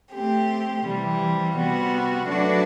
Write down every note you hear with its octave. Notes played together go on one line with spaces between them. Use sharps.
A3 C4 G4
C3 E3 G3
C3 G3 B3 F#4
F#3 A3 D4 F#4 B4